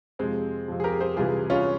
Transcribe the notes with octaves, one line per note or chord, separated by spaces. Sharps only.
F2 C3 F3 G#3 C4
F2 C3 F3
G#4
G4 A#4
G#4 C5
C2 C3 E3 F4 G#4
C#4 F4